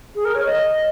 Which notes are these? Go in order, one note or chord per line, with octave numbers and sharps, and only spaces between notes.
G#4
A#4
C#5
D#5